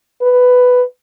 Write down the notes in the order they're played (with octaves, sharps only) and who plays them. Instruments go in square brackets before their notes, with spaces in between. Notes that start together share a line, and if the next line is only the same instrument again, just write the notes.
[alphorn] B4